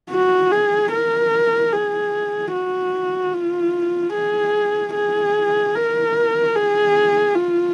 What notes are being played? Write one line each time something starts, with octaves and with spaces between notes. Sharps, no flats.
F#4
G#4
A#4
G#4
F#4
F4
G#4
G#4
A#4
G#4
F4